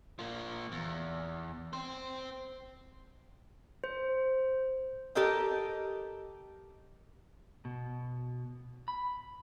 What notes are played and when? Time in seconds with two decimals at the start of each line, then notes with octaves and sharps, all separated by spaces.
0.19 F3 A#3
0.72 E2
1.73 C4 C5
3.84 C5
5.15 G4 A4 A#4 D#5 G5
7.65 B2
8.88 B5